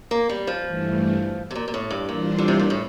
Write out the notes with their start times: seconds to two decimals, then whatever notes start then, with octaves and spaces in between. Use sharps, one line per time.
0.11 A#3
0.29 G3
0.47 F3
0.65 G2 E3 A3
1.51 C3
1.55 A#2
1.68 A#2
1.74 A2
1.90 G2
2.09 A#2 E3 G3 D4 F4 C5
2.38 D3
2.48 C3
2.59 A#2
2.70 A2